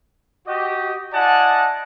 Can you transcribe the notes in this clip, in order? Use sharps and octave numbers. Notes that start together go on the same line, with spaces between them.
F#4 G4 D#5
E4 D5 D#5 F#5 G#5 A5